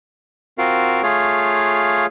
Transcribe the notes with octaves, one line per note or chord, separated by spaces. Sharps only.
C4 F4 F#4 A#4 F5
A3 F4 G#4 C#5 F5